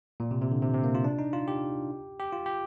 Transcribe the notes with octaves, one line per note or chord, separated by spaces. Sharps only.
A#2
C3
C3
D3
C3
C3
A#3
F4
D4
D#4
F4
G4
G4
F4
G4